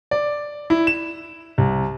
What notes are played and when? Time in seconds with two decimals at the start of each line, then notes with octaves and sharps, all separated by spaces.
0.11 D5
0.70 E4
0.87 E7
1.58 C2